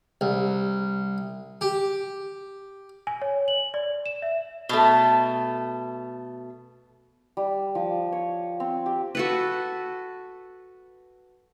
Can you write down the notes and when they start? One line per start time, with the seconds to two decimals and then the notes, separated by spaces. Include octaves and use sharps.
0.21 C2
1.61 G4
3.07 G#5
3.22 C#5
3.48 F#7
3.74 D5
4.06 E7
4.22 E5
4.69 B2 A3
7.37 G3
7.75 F3
8.12 C#5
8.60 C4
8.86 G4
9.15 F#4 A4 B4